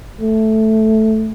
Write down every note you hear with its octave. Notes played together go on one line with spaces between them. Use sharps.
A3